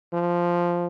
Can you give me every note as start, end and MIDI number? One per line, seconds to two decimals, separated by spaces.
0.14 0.87 53